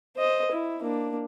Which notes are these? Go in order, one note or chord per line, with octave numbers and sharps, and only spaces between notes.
C5 D#5
E4
A#3 D4